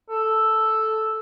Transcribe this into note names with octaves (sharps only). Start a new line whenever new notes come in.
A4